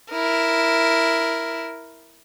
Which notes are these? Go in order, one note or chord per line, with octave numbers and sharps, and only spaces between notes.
E4 A#4